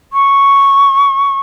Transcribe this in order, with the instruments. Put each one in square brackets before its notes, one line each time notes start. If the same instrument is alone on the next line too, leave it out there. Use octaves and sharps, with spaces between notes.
[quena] C#6